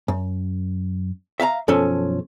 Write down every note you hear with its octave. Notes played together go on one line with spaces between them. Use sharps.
F#2
E5 F5 A5 A#5
B1 F#2 F3 C#4 A4